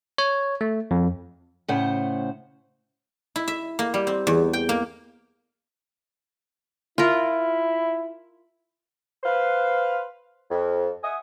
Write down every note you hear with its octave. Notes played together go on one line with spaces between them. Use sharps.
C#5
A3
F2
A2 C#3 C5 F#5
E4
E5
A#3
G3
C4
E2
G5
A#3
E4 F4 A#4
B4 C5 F5
F2
E5 F#5 G#5 D#6